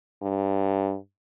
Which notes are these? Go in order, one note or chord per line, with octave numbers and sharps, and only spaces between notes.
G2